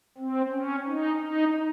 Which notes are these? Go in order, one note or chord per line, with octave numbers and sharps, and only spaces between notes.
C4
C#4
D#4
D#4